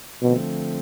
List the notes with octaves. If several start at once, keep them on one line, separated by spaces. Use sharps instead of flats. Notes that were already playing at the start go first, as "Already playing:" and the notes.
B2 D3 F3 A3 C4